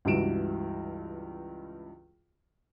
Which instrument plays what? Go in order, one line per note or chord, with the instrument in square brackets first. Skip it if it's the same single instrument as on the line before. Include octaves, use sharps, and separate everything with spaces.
[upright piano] C#2 G2 E3 F#4 D7 E7